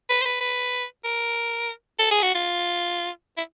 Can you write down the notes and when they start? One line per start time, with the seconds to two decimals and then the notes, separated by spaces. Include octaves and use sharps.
0.09 B4
0.21 C5
0.25 B4
0.40 B4
1.04 A#4
1.99 A4
2.11 G#4
2.22 F#4
2.35 F4
3.37 E4